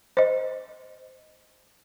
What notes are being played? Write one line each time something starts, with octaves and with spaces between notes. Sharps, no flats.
C5 D#5